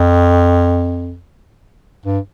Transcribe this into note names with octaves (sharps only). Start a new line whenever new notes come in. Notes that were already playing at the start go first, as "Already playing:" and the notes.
Already playing: F2
G2